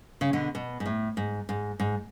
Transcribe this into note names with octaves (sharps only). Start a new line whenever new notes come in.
C#3
B2 D3
B2
G#2
A2
G#2
G#2
G#2